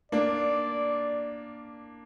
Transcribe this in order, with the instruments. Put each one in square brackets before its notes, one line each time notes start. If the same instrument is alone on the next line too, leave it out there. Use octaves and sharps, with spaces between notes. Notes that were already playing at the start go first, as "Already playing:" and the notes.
[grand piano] A#3 D4 [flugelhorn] D5